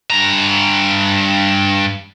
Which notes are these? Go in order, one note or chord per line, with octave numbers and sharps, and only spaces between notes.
G2 A#5